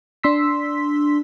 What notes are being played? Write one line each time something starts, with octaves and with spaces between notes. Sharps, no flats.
D4 C6 E6 B6